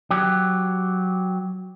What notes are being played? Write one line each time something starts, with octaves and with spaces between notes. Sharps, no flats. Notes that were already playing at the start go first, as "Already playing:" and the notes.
F#3 G4